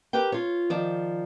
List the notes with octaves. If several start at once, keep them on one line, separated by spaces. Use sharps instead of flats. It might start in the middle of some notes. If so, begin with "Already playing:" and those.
G4 A#4 B4 G5
F4 C#5
D#3 F3 D5